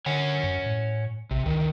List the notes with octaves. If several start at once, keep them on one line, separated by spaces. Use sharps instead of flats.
D3 C#5 F#5 G#5
F#2
A2
A#1 C3
C#2 D#3 E3